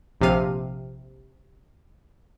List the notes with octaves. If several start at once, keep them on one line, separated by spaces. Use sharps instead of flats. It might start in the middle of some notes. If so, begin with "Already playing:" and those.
A#1 C3 F3 F5 D#7